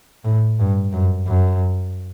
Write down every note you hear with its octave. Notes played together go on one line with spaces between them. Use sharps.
A2
G2
F#2
F#2